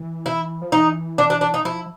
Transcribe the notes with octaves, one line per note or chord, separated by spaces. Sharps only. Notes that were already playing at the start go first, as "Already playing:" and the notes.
Already playing: E3
E4
F3
E3 D#4
D4
D4
D4
D#4
F3 E4